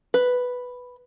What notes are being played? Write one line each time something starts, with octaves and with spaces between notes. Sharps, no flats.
B4